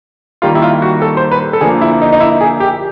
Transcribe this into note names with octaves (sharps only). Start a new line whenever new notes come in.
D#3 G3 A#3 F4
E4
F4
F#4
A4
C5
B4
A4
D3 F3 A#3 G#4
E4
D#4
D#4
E4
G#4
G4